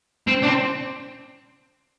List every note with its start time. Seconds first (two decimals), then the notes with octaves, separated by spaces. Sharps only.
0.27 C4
0.42 D4
0.46 C4